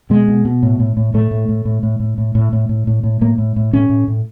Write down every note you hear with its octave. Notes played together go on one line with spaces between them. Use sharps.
B2 G#3
B2
B2
A2
A2
A2
A2 A3
A2
A2
A2
A2
A2
A2
A2
A2
A2
A2
A2
A2 A#3
A2
A2
A2 C#4
A2
A2